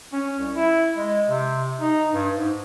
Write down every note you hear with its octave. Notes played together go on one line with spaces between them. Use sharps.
C#4
C2
E4
G#3
C3
D#4
G2
G#2